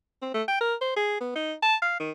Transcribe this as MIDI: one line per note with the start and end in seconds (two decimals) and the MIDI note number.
0.22 0.32 60
0.34 0.43 57
0.48 0.58 79
0.61 0.75 70
0.81 0.93 72
0.96 1.20 68
1.21 1.35 59
1.35 1.53 63
1.63 1.75 81
1.82 1.98 77
2.00 2.11 51